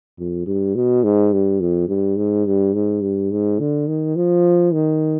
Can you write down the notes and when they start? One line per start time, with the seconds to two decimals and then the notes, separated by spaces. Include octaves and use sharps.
0.19 F2
0.47 G2
0.76 B2
1.04 G#2
1.33 G2
1.60 F2
1.89 G2
2.17 G#2
2.46 G2
2.74 G#2
3.03 G2
3.31 G#2
3.59 D3
3.88 D#3
4.16 F3
4.73 D#3